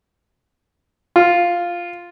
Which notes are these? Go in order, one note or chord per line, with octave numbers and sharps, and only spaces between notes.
F4